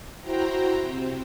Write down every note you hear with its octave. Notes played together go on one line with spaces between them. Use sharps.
E4 F#4 C5 G5 A#5
C3 C4